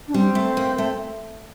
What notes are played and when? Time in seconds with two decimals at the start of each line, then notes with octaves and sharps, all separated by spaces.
0.08 D4
0.14 G3 C4
0.35 A3
0.57 A#3
0.78 A3